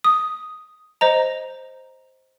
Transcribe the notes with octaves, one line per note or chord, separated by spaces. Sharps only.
D#6
C5 D#5 A#5